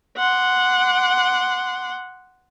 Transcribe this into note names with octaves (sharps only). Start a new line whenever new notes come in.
F#5 C6 D6